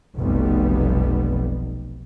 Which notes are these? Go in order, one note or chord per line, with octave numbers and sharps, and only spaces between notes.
F1 B1 C3 G3 B3